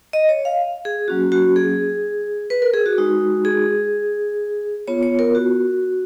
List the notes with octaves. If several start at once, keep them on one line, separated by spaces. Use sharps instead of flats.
D#5
C#5
F5
G#4
F#3 A#3 C#4 F#4
F#4
G#4
B4
A#4
G#4
F#4
G#3 D#4 F#4
G#4
B3 F4 C#5
C#5
A#4
F#4